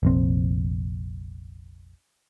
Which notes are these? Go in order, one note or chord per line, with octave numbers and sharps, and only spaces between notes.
F1 A#1 C4